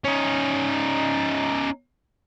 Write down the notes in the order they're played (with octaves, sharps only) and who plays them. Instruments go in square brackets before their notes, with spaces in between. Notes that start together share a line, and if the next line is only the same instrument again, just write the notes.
[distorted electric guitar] C#4 D#4